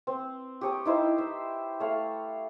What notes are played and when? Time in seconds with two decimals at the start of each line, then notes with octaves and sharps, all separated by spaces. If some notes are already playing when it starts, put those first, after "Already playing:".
0.07 C4
0.61 G4 C#5 D#6
0.86 D#4 E4 C5
1.18 E5
1.80 A3 C#5 F5